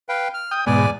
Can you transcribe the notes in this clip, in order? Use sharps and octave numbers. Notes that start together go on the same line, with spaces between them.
B4 F5 G5
F6
G5 D#6
E2 G#2 B2 D5 G#5